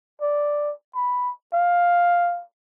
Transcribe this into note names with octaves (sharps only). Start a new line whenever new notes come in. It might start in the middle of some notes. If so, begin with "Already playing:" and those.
D5
B5
F5